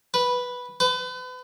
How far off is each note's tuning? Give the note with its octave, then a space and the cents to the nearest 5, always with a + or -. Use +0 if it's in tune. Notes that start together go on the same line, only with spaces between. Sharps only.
B4 -5
B4 +35